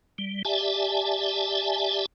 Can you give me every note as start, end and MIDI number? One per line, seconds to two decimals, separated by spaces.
0.18 0.43 55
0.45 2.06 67
0.45 2.06 74
0.45 2.06 76
0.45 2.06 80
0.45 2.06 81